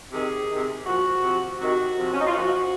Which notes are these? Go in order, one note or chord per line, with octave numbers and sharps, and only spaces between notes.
C3 D#3 G#4
C3 D#3
A#2 F3 F#4
C3 F3
C3 D#3 F#4
C3 F3
C#4
D#4
F4
A#2 F3 F#4